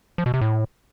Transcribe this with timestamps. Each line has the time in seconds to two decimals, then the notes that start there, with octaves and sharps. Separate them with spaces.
0.18 F3
0.26 B2
0.34 C3
0.41 A2